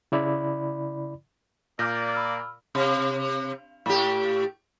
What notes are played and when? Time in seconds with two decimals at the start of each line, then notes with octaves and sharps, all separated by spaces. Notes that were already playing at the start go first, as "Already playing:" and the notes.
0.12 C#3 E4 D5 B5
1.79 A#2 A#3 D5 D6 F6 G6 A#6
2.14 B5 E6 F6
2.75 C3
3.86 A2 G4